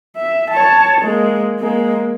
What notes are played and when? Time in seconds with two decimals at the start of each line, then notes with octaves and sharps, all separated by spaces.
0.16 E5
0.50 C#5 A5
1.01 G#3 A#3
1.59 G#3 A#3